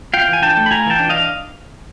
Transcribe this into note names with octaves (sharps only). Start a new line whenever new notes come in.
F4 F5 G5
E3 G#5
D4 G5 A5
A3
B5
F4 G#5 A#5
E3 G5 A5
D4
D#5 F5